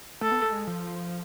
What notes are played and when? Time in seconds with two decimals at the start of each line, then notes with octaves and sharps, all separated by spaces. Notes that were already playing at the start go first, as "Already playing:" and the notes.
0.21 A3 A4
0.31 B3
0.42 A3
0.52 G#3
0.67 F3